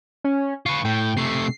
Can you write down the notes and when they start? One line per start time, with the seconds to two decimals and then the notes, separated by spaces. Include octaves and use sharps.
0.24 C#4
0.66 F4 B4 C#6
0.85 A2 G5
1.17 C3 A3 C7